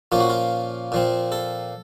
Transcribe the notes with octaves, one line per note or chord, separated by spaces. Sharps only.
A#2 F3 A#3 C#4 F4
F#4
F4
A#2 F3 C4
A4